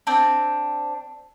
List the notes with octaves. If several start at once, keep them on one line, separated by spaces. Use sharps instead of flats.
C4 D4